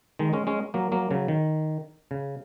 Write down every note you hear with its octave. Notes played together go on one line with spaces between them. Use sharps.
D#3 G#3
G#3 C#4
G#3 C#4
F#3 A#3
F#3 A#3
C#3 F#3
D#3
C#3